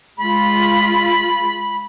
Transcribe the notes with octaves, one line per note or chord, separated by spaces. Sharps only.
G#3 F4 B5